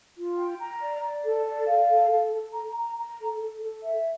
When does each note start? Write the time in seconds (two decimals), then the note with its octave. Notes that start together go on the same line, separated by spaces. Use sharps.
0.16 F4
0.37 G5
0.59 A#5
0.80 D5
1.02 D5
1.24 A4
1.46 D5
1.67 F5
1.88 A4
2.10 A4
2.32 A4
2.53 A#5
2.75 A#5
2.97 A#5
3.18 A4
3.40 A4
3.61 A4
3.83 E5